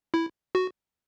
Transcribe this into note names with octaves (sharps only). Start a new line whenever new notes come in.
E4
F#4